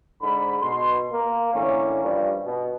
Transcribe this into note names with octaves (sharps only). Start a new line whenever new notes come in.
G#2 D3 B5
B2 C6
A#3
A2 D3 E3 A#3 C#4
G2 F3 G3
B2